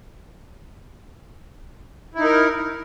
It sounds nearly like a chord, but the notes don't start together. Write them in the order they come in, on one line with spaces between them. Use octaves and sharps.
E4 D#4 A#4